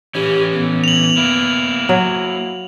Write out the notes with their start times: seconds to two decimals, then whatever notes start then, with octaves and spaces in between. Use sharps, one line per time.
0.15 E3 C#4 G4
0.53 B3
0.84 F7 F#7
1.17 A#3 E4
1.89 F#3